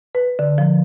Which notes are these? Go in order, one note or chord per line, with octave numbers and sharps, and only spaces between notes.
B4
D3
F3